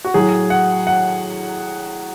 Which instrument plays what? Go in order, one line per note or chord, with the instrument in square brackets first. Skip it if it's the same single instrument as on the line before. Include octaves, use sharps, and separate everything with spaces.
[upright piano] F#4
A2 F#3 G#4
F#5
F#5